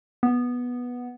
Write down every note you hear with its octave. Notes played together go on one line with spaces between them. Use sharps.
B3